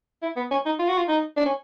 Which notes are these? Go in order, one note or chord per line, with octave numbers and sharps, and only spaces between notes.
E4
B3
C#4
D#4
F4
F#4
F4
D#4
D4
C#4